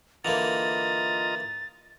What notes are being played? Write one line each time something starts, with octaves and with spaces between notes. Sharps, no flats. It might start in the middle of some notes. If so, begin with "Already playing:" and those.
D3 E3 A#3 F4 D#5 A#5 A6